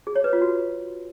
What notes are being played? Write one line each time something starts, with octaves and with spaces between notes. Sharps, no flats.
G#4
C#5
B4
F4
F#4